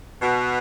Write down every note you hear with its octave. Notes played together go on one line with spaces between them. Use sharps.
B2